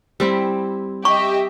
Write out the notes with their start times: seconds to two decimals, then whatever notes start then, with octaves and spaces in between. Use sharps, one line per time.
0.20 G3 C4 E4
1.05 G4 D#5 E5 C#6